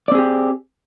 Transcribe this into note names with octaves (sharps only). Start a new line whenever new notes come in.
C4 G4 G#4 D5